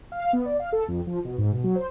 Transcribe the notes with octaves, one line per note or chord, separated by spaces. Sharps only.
F5
B3
D5
F5
A4
F2
F3
B2
G#2
B2
F#3
C5